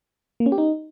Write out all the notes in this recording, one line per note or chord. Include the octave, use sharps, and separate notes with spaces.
A#3
C#4
G4
D#4